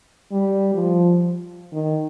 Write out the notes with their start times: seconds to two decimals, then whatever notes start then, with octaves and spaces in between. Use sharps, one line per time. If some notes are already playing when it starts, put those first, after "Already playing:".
0.32 G3
0.74 F3
1.73 D#3